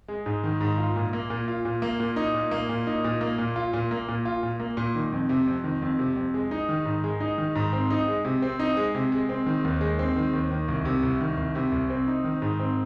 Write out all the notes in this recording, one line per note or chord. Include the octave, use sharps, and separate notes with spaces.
G#3
G#2
D#3
G#2
F4
A#2
A#3
A#2
F4
A#2
A#3
A#2
D#4
A#2
A#3
A#2
D#4
A#2
A#3
A#2
F4
A#2
A#3
A#2
F4
A#2
A#3
A#2
D#3
F2
C3
F2
D#3
F2
C3
F2
G#3
D#4
D#3
G#2
G#3
D#4
D#3
G#2
C4
D#4
G#3
C3
C4
D#4
G#3
C3
G#3
C4
D#3
D#2
G#3
C4
D#3
D#2
D#3
C2
C3
C2
D#3
C2
C3
C2
C4
D#4
D#3
G#2
C4